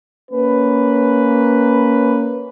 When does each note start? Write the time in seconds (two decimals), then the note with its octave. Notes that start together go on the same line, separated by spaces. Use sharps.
0.31 A#3 C#4 B4